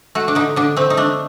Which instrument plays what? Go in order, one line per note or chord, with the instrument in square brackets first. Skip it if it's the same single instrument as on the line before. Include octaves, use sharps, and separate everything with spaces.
[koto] A3 F#4
D4
D3 D#4
D3 D4
A3 C4
D#4
A3 D4